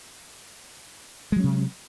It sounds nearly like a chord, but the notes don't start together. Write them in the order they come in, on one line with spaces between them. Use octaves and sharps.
G#3 F#3 C#4 C3